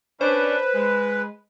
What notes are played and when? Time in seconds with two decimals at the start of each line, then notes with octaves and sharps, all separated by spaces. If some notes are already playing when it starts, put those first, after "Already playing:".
0.21 C#4 D4 B4 C5
0.75 G#3